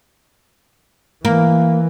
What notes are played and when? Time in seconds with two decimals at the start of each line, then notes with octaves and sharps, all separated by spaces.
1.25 E3 A#3